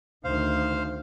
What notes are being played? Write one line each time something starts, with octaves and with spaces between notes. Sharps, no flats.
D2 D#3 C5 F5